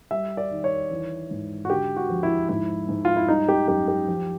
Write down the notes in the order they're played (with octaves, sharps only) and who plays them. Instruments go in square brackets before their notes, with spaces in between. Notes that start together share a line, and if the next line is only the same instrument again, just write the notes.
[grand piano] G3 E5
D5
D#3
C#5
E3
G#2
F#4
D3 G4
F#4
F3
E4
G#2 E4
G#2
F4
E4
G3 D#4
G4
F#2 G4
G4
F3